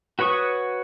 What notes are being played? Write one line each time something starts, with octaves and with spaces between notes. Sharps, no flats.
F#4 B4 C#5 C#6 D#6